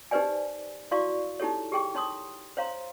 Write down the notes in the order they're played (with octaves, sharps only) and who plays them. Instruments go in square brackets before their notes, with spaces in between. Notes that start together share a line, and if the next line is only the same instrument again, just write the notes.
[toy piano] D#4 G4 B4 C5 D5 G#5
E4 F#4 D5 F5 C#6 D6
D#4 E4 G4 A4 C#5
G4 G#4 G5 C#6 D6
D#4 C#5 C6 D6 D#6
C5 C#5 F5 A#5 C6